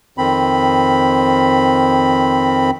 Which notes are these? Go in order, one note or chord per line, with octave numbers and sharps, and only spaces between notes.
F2 D#3 C4 B5